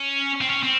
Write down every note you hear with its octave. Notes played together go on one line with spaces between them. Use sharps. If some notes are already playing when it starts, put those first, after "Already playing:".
Already playing: C#4
C4
C#4
C4